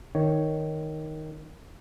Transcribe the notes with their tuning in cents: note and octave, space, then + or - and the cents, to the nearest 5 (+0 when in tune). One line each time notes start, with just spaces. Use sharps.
D#3 +0 C#5 +0